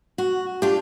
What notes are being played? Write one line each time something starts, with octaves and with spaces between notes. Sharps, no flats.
F#4
D4 F4 G4